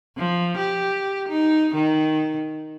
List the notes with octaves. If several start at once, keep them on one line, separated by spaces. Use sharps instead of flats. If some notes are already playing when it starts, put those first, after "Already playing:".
F3
G4
D#4
D#3